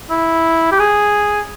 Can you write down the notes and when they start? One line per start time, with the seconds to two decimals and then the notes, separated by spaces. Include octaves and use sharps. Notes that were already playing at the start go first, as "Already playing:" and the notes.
0.10 E4
0.72 G4
0.79 G#4